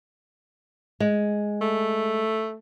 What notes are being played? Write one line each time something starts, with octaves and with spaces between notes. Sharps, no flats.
G#3
A3